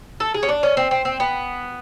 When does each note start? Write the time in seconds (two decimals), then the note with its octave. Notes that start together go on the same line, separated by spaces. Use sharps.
0.20 A4
0.34 G#4
0.43 C#4
0.49 D4
0.63 C#4
0.77 C4
0.91 C4
1.05 C4
1.20 B3